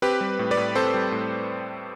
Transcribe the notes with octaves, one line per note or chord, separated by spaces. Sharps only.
C4 G4 B4
G3
A2
B4 D5
A2
C4 A4 C5
G3
A2